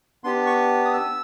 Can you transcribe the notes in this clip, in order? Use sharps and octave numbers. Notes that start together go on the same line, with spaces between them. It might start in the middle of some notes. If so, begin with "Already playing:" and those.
B3 D4 G4 C6
C#6
D#6
E6